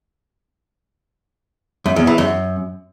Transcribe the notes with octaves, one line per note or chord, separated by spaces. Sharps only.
F#2
E2
E3
F#2